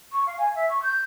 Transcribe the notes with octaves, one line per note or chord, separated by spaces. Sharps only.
C#6
F5
G#5
E5
C#6
G6